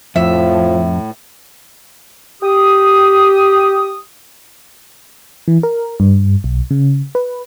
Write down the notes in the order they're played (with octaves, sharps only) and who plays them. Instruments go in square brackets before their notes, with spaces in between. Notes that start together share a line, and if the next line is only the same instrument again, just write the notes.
[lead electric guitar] F2 [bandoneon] A2 [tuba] F3 [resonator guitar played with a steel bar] E5
[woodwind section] G4 D#6
[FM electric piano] E3
A#4
G2
B1
C#3
B4